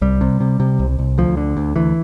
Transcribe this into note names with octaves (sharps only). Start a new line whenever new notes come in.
C2 G3
C3
C3
C3
C2
C2
D2 F3
D3
D2
D2 E3